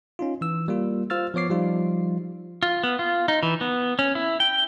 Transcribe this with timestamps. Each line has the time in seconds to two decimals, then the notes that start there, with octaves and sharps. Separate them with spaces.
0.19 C#4 D#4 F4
0.41 E3 E6
0.68 G3 A#3 F4
1.10 F4 C5 E6 F6 A6
1.34 F3 B3 C#5 D6 C7
1.50 F3 G3 D#4 F4
2.63 F4
2.84 B3
2.99 F4
3.28 D#4
3.43 E3
3.61 B3
3.99 C#4
4.15 E4
4.40 G5